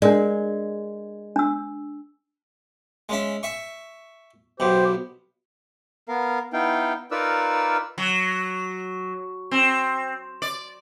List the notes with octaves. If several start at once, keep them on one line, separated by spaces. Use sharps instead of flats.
G#3 D4 A#4 D5
D4 E6
G#3 C#4 E5
E5 C#6
B1 B2 G4 C5
B3 A#4 F5
B3 D#4 E4 F5 G5
D#4 F4 A#4 B4 D5 E6
F#3
C4
D5